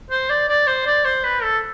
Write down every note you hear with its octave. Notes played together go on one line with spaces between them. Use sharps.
C5
D5
D5
C5
D5
C5
B4
A4